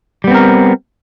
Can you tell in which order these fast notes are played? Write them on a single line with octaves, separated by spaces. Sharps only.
G3 B3 C4 A#4